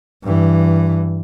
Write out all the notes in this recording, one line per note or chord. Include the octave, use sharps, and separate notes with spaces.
G2 E3